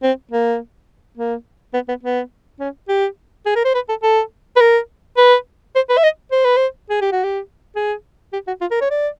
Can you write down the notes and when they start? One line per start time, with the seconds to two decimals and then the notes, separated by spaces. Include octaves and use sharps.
0.03 C4
0.31 A#3
1.17 A#3
1.74 B3
1.89 B3
2.03 B3
2.60 C#4
2.88 G4
3.46 G#4
3.56 A#4
3.65 C5
3.75 B4
3.89 A4
4.03 A4
4.56 B4
4.60 A#4
5.17 B4
5.75 C5
5.90 B4
5.97 E5
6.04 D#5
6.32 C5
6.44 B4
6.57 C5
6.90 G#4
7.01 G4
7.12 F#4
7.24 G4
7.75 G#4
8.33 G4
8.47 F#4
8.61 F4
8.71 A#4
8.81 C#5
8.91 D5